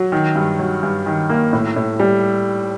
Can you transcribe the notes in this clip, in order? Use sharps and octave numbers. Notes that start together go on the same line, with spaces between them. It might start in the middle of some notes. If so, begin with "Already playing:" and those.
Already playing: F#3
D#3
G2
F#3
G2
D#3
A#3
A2
A2
G3